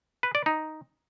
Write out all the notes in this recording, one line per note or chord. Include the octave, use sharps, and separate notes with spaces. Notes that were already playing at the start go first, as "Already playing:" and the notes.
B4
D5
D#4